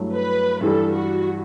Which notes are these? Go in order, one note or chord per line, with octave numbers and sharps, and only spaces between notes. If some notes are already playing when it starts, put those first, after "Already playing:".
Already playing: G2 F#3 A3 E4
B4
G2 E3 G3 A4
F#4